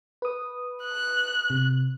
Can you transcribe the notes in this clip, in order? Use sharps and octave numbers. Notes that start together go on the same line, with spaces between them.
B4 D#6
F#6
C3